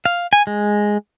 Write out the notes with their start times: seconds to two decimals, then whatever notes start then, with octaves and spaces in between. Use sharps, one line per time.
0.05 F5
0.33 G#5
0.47 G#3